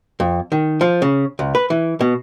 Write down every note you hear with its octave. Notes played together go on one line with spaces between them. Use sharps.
F2
D#3
F3
C#3
C#2
B4
E3
B2